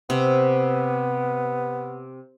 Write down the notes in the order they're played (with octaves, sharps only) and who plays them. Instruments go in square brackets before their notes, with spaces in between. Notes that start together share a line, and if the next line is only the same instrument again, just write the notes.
[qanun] C3 [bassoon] B3